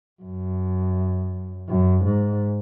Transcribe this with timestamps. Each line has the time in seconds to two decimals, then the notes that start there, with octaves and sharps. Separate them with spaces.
0.22 F#2
1.69 F#2
2.05 G#2